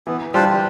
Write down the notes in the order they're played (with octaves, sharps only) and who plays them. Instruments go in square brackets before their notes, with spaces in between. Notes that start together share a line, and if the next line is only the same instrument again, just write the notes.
[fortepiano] E3 [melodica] B3
[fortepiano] G3 [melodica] D4 F4 C5